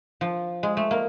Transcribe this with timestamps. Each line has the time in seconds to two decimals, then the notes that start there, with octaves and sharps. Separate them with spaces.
0.21 F3
0.63 G#3
0.77 A3
0.91 A#3